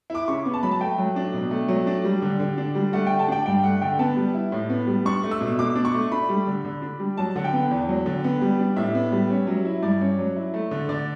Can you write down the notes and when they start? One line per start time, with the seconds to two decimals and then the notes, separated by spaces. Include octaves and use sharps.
0.10 E4 D6
0.28 C#3 C#6
0.46 B3
0.54 A5
0.63 F#3 B5
0.72 A5
0.80 A3 G5
0.98 F#3
1.16 D4
1.33 B2
1.51 A3
1.68 F#3
1.87 D4
2.05 G3
2.22 D3
2.40 D3
2.58 D4
2.75 G3
2.93 A3 F#5
3.07 D3 G5
3.19 A5
3.28 D4 G5
3.46 G2 G5
3.64 A3 F#5
3.81 D3 G5
3.99 B3 A5
4.16 G3
4.34 E4
4.52 A2
4.69 B3
4.87 G3
5.06 D4 C#6
5.24 A3
5.31 E6
5.41 B2
5.59 B2 D6
5.75 D4
5.85 C#6
5.94 A3
6.12 D4 B5
6.29 G3
6.47 D3
6.64 D3
6.82 D4
7.00 G3
7.18 F#3 A5
7.35 D3 F#5
7.44 G5
7.53 B3
7.71 E2
7.89 F#3
8.06 D3
8.24 B3
8.41 G3
8.59 D4
8.76 A2 E5
8.94 B3
9.12 G3
9.30 C#4
9.47 F#3
9.65 E4
9.82 G2 D5
10.01 C#4
10.19 F#3
10.36 E4
10.54 A3
10.71 D3
10.89 D3 D5